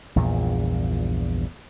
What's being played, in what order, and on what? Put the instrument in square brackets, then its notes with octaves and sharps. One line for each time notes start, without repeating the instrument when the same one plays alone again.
[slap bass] A#1 E2 G2 A#2